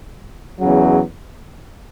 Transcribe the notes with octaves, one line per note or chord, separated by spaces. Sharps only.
E2 C#3 F#3